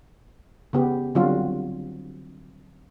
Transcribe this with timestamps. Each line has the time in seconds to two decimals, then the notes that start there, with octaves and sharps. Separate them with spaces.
0.73 C#3 B3 G4
1.15 D3 F#3 G3 C4 F4 F#4